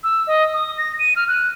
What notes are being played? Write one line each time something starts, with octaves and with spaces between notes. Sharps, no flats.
E6
D#5
D#6
A#6
D#7
F6
F#6